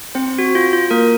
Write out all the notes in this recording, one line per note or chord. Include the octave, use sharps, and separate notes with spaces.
C4 C5
F#4
F4
F4
A#3 A#4